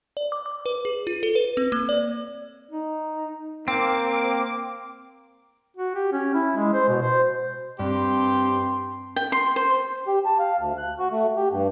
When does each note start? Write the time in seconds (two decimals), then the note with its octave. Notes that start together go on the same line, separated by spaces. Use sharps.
0.17 D5
0.32 D6
0.46 D6
0.66 B4
0.85 G#4
1.07 F4
1.23 A4
1.35 B4
1.57 C4
1.72 A#3
1.89 D5
2.71 D#4
3.68 A#3 C4 D6
5.77 F#4
5.95 G4
6.12 C#4
6.34 E4
6.56 G#3
6.74 C5
6.89 B2
7.02 C5
7.79 G2 C4 G4 C6
9.16 G5
9.32 C6
9.56 C5
10.07 G4
10.25 A5
10.39 F5
10.58 D2
10.78 F#6
10.99 F#4
11.11 A3
11.36 G4
11.52 G2